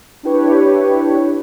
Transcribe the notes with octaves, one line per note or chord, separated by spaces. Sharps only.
D4 E4 G4 B4 C#5